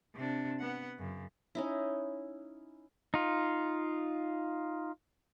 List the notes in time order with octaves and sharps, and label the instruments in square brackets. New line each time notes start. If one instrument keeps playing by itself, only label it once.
[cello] C3 D4
B3 F#5
F#2 C#3
[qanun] C#4 D#4 E4
[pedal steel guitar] D#4 F4